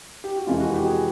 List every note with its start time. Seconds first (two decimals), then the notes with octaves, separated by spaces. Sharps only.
0.24 G4
0.36 F#4
0.47 F2 C3 E3 G#3 F4
0.60 F#4
0.74 G4
0.86 G#4